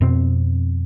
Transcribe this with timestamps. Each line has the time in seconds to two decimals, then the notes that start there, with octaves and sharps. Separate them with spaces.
0.01 F2 B2 C4